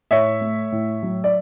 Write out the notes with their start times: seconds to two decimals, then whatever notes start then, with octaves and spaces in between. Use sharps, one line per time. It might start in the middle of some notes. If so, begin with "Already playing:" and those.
0.11 A2 C#5 E5
0.41 A3
0.72 A2
1.03 F#3
1.24 D5